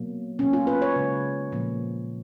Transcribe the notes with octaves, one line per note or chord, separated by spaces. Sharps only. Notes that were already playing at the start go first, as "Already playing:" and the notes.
Already playing: B2 F#3 A#3
B2 F#3 A#3 C#4
F4
B4
C#5
C#3 G#3
A#2 F3 A#3